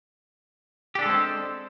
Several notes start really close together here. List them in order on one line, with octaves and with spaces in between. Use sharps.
G4 D4 A4 G#3 C4